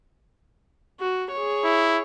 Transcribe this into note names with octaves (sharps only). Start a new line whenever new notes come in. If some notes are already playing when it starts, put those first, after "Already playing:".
F#4
G#4 C#5
E4